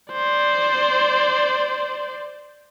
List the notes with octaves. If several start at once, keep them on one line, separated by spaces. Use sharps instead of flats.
C5 D5